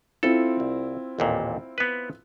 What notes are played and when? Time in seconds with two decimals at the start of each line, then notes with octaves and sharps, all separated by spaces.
0.23 C4 E4 F4 A4
0.60 C2
1.19 A1 D#2 A#2
1.78 B3 B4